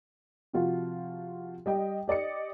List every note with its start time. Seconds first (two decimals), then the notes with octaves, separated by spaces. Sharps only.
0.53 C3 F3 F4 F#4
1.66 G3 D#5 G5
2.08 G4 D5 D#5 C#7